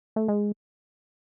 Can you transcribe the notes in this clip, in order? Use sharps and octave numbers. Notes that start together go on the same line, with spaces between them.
A3
G#3